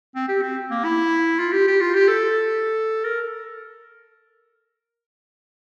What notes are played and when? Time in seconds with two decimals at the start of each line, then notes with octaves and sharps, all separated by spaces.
0.15 C4
0.28 G4
0.42 C4
0.71 A#3
0.84 E4
1.39 F4
1.52 G4
1.67 G4
1.81 F4
1.94 G4
2.08 A4
3.04 A#4